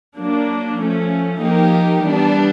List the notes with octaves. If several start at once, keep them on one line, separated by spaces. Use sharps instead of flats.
F#3 A#3 D4
F3 A3 C#4
F3 A#3 D#4 G4 A#4
E3 G3 B3 D4